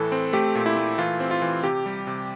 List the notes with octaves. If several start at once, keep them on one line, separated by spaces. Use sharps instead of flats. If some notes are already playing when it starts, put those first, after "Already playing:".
Already playing: A2 E3 A4
C4
A3 G4
A#2
E4
A3
E3 F4
C4
F4
E3
C3 G4
G3
C3